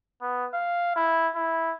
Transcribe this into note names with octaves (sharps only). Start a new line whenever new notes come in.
B3
F5
E4
E4